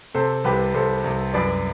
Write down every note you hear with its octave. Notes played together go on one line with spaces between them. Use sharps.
C3 A4 C5
C2 G4 B4
C2 A4 C5
C2
F#2 B4 D5